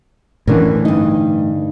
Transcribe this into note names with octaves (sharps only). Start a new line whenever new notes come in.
A2 D3 E3 C#4 A#4
G2 D#4